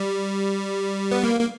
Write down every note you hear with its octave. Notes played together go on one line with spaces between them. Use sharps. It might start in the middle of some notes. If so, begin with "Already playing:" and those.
Already playing: G3
B3
A#3
A#3